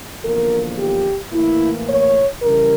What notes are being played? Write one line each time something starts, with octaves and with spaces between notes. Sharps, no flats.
E2 D3 F3 A#3 A#4
G4
A2 E3 A#3 E4
C#5
C#3 E3 G3 A#4